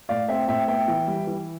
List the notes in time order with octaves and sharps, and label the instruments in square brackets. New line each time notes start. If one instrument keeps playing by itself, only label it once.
[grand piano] A2 D5 F5
C4 E5 G5
A2 E5 G5
B3 E5 G5
E3
G3
E3